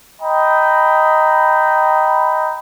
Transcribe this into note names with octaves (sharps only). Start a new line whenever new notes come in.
D#5 G5 A#5 B5